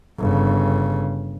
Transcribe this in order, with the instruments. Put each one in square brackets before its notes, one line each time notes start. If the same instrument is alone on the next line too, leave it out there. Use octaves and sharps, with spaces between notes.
[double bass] G1 C#3